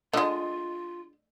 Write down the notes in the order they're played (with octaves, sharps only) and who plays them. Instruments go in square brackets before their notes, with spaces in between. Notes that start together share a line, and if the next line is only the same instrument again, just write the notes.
[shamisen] D3 G#3 [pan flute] F4 [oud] D#5